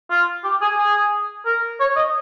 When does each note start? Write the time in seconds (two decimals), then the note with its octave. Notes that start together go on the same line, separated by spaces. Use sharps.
0.10 F4
0.44 G4
0.61 G#4
0.78 G#4
1.45 A#4
1.80 C#5
1.96 D#5